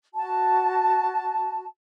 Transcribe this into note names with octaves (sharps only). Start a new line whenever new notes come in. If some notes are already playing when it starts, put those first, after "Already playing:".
F#4 A5